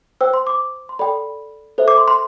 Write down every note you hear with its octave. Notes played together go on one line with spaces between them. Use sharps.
C5 G5 E6
C6
D6
C6
A4 D5 G5 B5
A4 C5 E5
D6
C6
C6